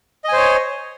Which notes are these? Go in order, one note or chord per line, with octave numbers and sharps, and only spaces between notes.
C5 C#5 D#5 G#5